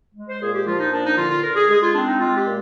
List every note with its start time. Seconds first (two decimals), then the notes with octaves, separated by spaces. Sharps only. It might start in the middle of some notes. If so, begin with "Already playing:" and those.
0.15 G#3
0.29 C5
0.41 A#2 G#4
0.53 G4
0.66 F3 F4
0.79 D#4
0.92 A#2 D4
1.04 D#4
1.17 D3 F4
1.30 F4
1.43 D3 A#4
1.56 G#4
1.68 G#3 G#4
1.81 F4
1.94 C4 D4
2.07 D#4
2.19 G#3 F4
2.37 G4
2.45 A#2